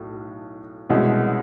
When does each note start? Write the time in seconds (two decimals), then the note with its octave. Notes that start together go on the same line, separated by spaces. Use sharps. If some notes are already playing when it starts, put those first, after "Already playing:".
Already playing: B1 A2
0.89 C2 B2 G#3 C#4 E4